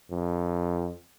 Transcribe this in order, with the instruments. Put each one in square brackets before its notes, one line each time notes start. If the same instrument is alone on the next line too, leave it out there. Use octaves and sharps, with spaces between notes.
[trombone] F2